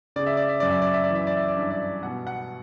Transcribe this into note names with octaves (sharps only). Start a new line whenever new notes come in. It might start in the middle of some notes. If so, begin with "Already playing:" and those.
C#3 D5
E5
D5
E5
F#2 D5
E5
D5
E5
D5
E3
E5
D5
E5
D5
G2 E5
D5
B2 F#5
F#5